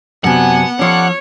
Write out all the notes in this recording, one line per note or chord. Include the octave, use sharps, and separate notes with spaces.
F#2 C3 B3 D4 F#5 G#5
F3 G3 C#4 A4 C#5 D6